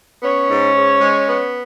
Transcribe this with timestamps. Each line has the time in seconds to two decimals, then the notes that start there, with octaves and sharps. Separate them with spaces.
0.23 B3 C#4 C#5
0.49 G#2
0.76 G#2
1.01 G#3
1.28 B3